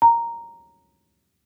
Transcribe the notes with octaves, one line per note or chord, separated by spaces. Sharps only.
A#5